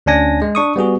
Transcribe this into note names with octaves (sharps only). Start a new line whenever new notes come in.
D2 C#4 D4 G#5 A#6
G#3
D4 C#6 D#6
G3 B3 F#4 G#4